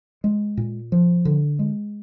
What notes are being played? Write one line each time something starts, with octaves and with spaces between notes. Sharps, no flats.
G#3
A#2
F3
D3
G#3